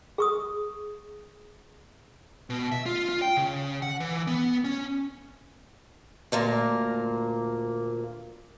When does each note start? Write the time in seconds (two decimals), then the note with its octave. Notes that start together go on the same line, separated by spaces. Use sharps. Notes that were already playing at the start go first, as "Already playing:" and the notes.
0.18 G#4 C#6 D#6
2.50 B2
2.72 E5
2.86 F4
3.09 F4
3.22 G5
3.37 C#3
3.82 F#5
4.00 E3
4.27 B3
4.64 C#4
6.32 D2 A#2 A#3